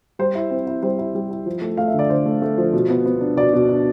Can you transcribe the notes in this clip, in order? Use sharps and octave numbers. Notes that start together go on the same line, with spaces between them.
G3 C5
E4
C4
E4
G3 C5
E4
G3
E4
F3
A3
A3 F5
E5
D3
D5
D3 C5
A3
A3
F3
B2
B3
B3
D4
B2 D5
B2
D4